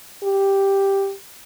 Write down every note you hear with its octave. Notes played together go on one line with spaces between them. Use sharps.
G4